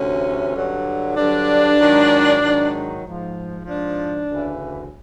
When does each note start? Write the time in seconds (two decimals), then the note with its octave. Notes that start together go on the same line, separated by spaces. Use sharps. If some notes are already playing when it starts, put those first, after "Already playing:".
Already playing: D2 C3 E3 C#4
0.55 G2 D3 F#3
1.16 G2 D3 F#3 D4
1.79 G#2 D#3 F#3
2.41 G#2 D#3 F#3
3.03 G#2 F3
3.65 G#2 F3 D4
4.28 D2 C#3 E3